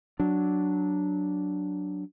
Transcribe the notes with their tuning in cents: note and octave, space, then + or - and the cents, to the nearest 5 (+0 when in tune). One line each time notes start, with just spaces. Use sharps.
F#3 +0 D4 +0